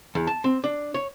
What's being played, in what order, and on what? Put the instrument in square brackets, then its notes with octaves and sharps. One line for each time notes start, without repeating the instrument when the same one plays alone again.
[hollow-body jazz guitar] E2
A5
C4
D4
C#5